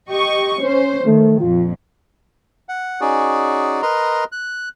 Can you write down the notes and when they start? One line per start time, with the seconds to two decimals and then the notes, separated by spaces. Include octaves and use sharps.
0.11 G4 D#5 C#6
0.60 C#4 C5
1.06 D#3 A3
1.40 A#1 F2 F4
2.69 F#5
3.01 C#4 D#4 F#4 G#4 D5
3.82 A#4 B4 D#5 A#5 C6
4.32 F#6